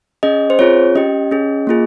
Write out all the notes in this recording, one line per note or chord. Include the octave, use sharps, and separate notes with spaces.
C#4 G#4 D#5
C5
C4 F4 G#4 C#5
C#4 G4 D#5
C#4 G#4
A#3 F4 G#4